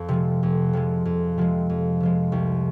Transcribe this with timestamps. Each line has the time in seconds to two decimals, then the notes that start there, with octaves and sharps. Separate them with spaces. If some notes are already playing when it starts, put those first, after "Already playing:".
Already playing: F2
0.08 C3 F3 G#3
0.43 F2
0.73 C3 F3 G#3
1.05 F2
1.38 C3 F3 G#3
1.69 F2
2.00 C3 F3 G#3
2.32 C2